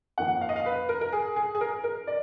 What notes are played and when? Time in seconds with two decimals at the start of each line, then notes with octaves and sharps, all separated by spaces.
0.18 F2 D#3 A#3 F#5
0.41 F5
0.49 D#5
0.56 F5
0.66 B4
0.89 A#4
1.01 A#4
1.13 G#4
1.36 G#4
1.55 G#4
1.61 A#4
1.84 A#4
2.07 D5